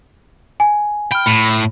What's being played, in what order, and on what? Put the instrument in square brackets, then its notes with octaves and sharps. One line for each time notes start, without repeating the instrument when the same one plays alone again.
[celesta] G#5
[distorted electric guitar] G5 [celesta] B5 F6
[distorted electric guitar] A2 [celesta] B5 C#7 F7